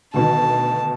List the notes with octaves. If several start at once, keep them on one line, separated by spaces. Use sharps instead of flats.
D2 B2 D#3 A5